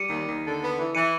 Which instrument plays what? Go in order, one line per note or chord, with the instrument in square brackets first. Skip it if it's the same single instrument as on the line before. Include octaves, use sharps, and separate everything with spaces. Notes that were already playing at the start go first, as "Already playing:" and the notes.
Already playing: [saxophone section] G3 [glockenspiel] C#7 D#7
[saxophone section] D#2
D#2
D3
B3
E3
[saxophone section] E3 [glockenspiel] C#7 D#7